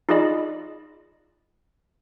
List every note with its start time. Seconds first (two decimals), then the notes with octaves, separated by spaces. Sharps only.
0.09 D#4 F4 G#4 D5 D#5 B5